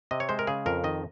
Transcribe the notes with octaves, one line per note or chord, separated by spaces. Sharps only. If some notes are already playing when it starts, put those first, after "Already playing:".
C3 D#5
C#5
G#3 C5
A#4
C#3 G#4
F2 A#4
D#3 D#5